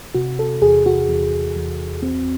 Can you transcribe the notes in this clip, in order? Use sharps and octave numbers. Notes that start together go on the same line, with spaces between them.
C3 F#4
A4
E2 G#4
F#4
E2
E2
C4